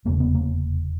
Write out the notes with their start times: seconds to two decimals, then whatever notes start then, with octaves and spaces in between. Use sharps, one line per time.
0.05 F1 E2 C#3 A#3
0.20 B3
0.35 A#3